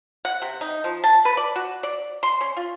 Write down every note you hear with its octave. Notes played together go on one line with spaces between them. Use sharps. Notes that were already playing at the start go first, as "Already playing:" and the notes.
F#5
C3
D#4
F3
A5
B4
D5
F#4
D5
C6
C#4
F4